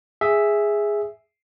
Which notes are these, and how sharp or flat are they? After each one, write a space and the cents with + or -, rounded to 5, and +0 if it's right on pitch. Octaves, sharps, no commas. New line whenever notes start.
G#4 -5 E5 +0